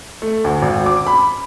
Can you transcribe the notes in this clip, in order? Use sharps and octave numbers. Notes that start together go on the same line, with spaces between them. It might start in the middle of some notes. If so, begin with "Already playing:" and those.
A3
D2
G#1
D6
B5